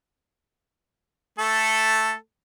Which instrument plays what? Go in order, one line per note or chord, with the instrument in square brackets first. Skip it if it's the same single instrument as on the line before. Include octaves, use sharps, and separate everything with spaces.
[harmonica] A3 A4